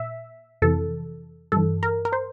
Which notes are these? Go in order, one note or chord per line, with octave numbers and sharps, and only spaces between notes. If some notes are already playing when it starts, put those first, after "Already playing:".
Already playing: A#2 E5
F2 C3 E3 A4
G2 E3 A4
A#4
A#4
C5